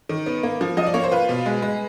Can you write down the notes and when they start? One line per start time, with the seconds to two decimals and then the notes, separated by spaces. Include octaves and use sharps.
0.09 D#3
0.26 B3
0.43 A#3
0.61 F3
0.77 F3 D#5
0.86 D5
0.94 A#3 C#5
1.03 C5
1.11 F4 B4
1.29 B2
1.46 G#3
1.62 G#3